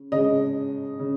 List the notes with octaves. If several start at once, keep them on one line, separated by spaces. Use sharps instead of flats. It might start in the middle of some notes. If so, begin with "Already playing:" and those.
Already playing: C#3
C#3 G#3 D#5
C#3